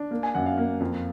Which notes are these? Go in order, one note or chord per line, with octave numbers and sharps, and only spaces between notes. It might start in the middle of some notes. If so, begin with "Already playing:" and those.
Already playing: D4
A#3
G#5
F#2 F#5
F5
A#3
F2